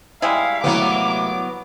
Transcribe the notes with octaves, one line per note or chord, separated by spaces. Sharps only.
G3 G#3 E4 F5
A2 C3 F#3 A#3 B3 D6